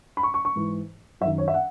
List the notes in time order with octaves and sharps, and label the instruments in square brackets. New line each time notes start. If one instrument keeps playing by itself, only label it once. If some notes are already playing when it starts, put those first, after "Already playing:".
[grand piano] B5
C#6
C#6
C#6
G#2 E3
F#2 E5
D#3
C#5
E5
F#5